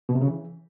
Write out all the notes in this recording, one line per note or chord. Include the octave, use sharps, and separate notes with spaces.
B2
C3
C#3
E3